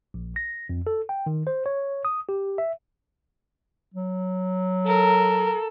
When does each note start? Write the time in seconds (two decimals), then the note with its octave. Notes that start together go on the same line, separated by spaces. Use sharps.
0.14 A#1
0.36 A#6
0.69 F2
0.87 A4
1.09 G5
1.26 D#3
1.47 C5
1.66 C#5
2.05 D#6
2.29 G4
2.58 E5
3.94 F#3
4.87 A4 A#4